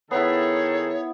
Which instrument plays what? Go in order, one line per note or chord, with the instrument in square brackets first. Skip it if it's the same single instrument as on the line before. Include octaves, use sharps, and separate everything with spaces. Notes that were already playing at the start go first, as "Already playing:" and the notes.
[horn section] D#3 G#4 A4 [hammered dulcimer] B3 E4 [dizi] C#5